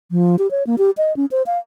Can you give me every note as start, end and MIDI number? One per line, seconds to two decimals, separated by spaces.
0.11 0.36 53
0.39 0.50 67
0.51 0.63 73
0.67 0.76 58
0.78 0.91 67
0.97 1.15 75
1.17 1.26 61
1.31 1.42 72
1.46 1.58 77